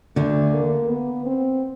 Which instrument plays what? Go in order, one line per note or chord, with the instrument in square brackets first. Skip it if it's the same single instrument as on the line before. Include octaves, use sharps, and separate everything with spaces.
[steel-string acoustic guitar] D2 D3 [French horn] A3
[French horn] A#3
B3
C4